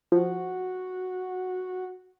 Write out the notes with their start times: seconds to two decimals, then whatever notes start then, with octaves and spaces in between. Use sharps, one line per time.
0.12 F3 F#4